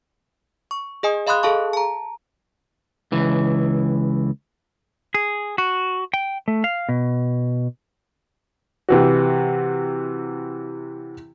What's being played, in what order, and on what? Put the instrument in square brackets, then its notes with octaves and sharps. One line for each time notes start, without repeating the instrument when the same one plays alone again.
[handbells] C#6
G#4 D#5 G#5 D#6
D#5 F5 B5 C6 D#6 F#6
G#4 A4 F5 A5 C#6
A5 A#5
[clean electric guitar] C#2 E3
G#4
F#4
G5
A3
F5
B2
[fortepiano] C3 E3 F#4